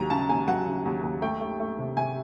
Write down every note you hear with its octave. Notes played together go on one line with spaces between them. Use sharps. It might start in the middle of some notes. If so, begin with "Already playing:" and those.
Already playing: D#2 F#3 A#5
C#3 A5
D#2 G#5
F#3 F#5
C#3
D#2
D#2
A3 G5
A3
A3
C3
C3 G#5